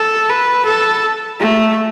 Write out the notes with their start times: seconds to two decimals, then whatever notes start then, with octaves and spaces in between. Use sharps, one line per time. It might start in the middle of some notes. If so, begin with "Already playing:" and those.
Already playing: A4
0.29 B4
0.65 A4
1.40 A3